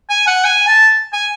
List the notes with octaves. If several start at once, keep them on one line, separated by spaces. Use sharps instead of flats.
G#5
F#5
G#5
A5
G#5